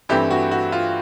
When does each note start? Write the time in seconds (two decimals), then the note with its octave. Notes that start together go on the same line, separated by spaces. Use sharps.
0.09 G2 E3 A3 C4 G4
0.31 F#4
0.51 F#4
0.72 F4